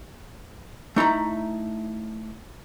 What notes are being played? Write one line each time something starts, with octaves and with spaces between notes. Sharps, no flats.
A3 D#4 E4 A#5